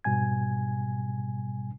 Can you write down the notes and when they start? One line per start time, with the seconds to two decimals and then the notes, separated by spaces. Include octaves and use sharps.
0.04 G#2 B2 G3 G#5 G#6